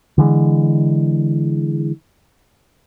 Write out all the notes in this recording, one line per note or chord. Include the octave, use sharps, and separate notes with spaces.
D3 E3 G#3